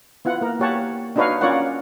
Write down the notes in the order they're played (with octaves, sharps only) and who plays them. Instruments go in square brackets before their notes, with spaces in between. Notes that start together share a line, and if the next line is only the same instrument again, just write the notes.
[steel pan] B3 E4 F4 F#5
A#3 A#4
A#3 G4 C#5 F#5 A5
D4 D#4 F#4 B4 C#5 F5
C#4 F4 A#4 C#5 D5 F#5